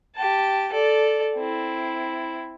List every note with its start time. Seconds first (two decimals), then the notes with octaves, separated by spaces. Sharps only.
0.16 G4 A5
0.72 A4 D5
1.36 C4 E4